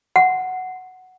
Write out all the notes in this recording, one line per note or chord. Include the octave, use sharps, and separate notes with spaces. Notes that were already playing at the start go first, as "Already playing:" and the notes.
F#5